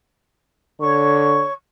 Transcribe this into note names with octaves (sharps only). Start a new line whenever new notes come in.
D3 C#5 C#6